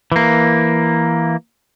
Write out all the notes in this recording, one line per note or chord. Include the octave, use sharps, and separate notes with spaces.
E3 A#3